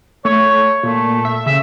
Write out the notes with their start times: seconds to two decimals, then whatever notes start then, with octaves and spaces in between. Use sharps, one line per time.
0.25 A3 C#5
0.83 A#2 A3
1.25 E5
1.46 C#3 E5